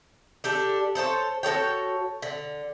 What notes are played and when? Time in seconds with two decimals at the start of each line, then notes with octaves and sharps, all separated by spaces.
0.44 D4 G4 A4
0.95 A4 C5 C#5 A5
1.43 F#4 A4 C#5 G5
2.22 D3